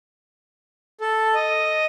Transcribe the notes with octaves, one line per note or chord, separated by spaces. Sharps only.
A4
D#5